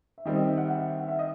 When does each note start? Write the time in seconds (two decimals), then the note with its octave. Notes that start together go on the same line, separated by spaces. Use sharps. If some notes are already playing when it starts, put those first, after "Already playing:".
0.18 E5
0.25 D#3 G3 C4 D#5
0.36 D#5
0.42 E5
0.57 F#5
0.68 F#5
0.73 E5
0.88 E5
0.99 F#5
1.08 E5
1.19 D#5